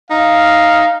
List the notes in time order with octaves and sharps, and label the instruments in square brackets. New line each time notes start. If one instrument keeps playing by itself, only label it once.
[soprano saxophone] D#4 [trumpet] F5